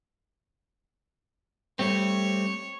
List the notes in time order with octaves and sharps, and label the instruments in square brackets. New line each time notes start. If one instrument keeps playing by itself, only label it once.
[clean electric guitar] G3 A3 C4 [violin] C#5